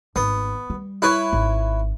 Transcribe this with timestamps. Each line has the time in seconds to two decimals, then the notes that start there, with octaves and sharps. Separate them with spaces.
0.16 G#1 B3
0.70 G3
1.02 E4 B4 C#5
1.33 G#1